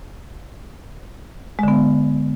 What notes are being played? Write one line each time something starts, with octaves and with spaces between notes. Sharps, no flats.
D3 G#3 B3